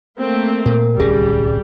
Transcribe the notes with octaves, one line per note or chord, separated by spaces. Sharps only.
A3 A#3 C4
A#2 A#4
D1 C2 G3 C#4 G#4